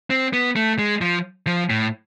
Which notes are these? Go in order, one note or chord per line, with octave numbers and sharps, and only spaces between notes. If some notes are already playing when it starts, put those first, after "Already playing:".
C4
B3
A3
G#3
F3
F3
A2